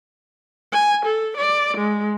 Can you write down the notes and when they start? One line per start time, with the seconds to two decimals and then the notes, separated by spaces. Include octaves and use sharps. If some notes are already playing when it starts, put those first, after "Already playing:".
0.72 G#5
1.05 A4
1.37 D5
1.77 G#3